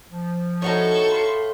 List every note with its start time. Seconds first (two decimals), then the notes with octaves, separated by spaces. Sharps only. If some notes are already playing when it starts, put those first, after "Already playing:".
0.12 F3
0.62 A2 D#4 F#4 A4 C#5 C#6
1.11 F5 B5 C6